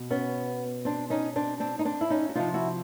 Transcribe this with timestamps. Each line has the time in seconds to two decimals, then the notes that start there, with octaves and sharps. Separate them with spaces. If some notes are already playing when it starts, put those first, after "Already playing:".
Already playing: B2
0.10 B3 C#4
0.85 C4 D4
1.10 C#4 D#4
1.36 C4 D4
1.60 C4 D4
1.79 D#4
1.85 C4 D4
2.01 E4
2.10 C#4 D#4
2.29 F#4
2.35 C3 F3 D#4 F4
2.54 E4 F#4